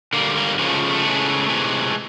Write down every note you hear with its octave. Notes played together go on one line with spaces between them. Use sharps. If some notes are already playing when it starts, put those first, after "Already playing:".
D3 G3 A#3
A#3
C#3 F3 G#3 A#3
A3
A3
C#3 E3 G#3
C3 E3 G#3